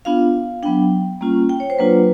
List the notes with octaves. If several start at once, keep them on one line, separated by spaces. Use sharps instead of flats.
B3 D4 F4 F5
F#3 B3 D4 G5
G3 A#3 C#4 F4
G5
C#5
C5
F#3 A#3 D4 F4 B4